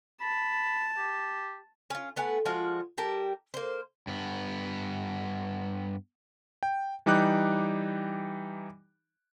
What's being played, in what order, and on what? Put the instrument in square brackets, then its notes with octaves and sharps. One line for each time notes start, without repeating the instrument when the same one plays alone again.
[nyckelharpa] A5 [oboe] B5
[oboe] G4
[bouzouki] C#4 F4
A3 B3 F#5 G#5
F3 G#3 F4 F#4
G3 G4 A#4 A5
A#3 C5
[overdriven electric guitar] G2 B3
[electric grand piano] G5
E3 G3 D#4 G5 D6 F#6